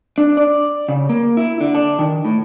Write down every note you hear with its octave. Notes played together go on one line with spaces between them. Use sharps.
D4
D5
C#3
A#3
E4
D3
D4
D#3
A2